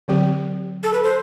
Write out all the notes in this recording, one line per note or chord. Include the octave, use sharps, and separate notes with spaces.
D3 F#3 C4 G4
A4
B4
C5